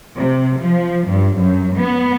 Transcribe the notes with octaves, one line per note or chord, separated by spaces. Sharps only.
C3
F3
G2
F#2
B3